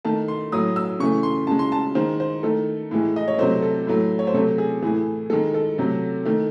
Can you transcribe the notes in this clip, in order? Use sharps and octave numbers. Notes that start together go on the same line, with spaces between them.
D#3 A3 A5
C6
A2 F#3 A3 D#6
E6
C#3 E3 A3 C#6
C6
C#3 G#3 A5
C6
A5
D#3 G#3 C5
C5
D#3 A3 A4
A2 E3 G#3
D#5
C#5
C3 F#3 A3 C5
A4
A2 F#3 A3
C#5
C5
C3 F#3 A3 A4
G#4
A2 E3 A3 G#4
D#3 G#3 A4
A4
C3 F#3 A3
D#3 A3